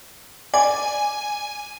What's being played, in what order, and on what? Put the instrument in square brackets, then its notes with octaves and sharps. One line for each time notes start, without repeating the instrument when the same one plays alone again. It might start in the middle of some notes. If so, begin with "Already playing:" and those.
[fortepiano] D5 [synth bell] G#5